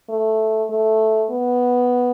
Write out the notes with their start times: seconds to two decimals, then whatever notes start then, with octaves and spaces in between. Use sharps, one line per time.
0.09 A3
0.70 A3
1.31 B3